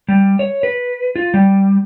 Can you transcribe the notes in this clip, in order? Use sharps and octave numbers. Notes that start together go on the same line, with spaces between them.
G3
C#5
B4
F4
G3